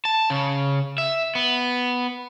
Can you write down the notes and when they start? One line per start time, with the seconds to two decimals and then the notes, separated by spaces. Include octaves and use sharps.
0.05 A5
0.30 C#3
0.98 E5
1.35 B3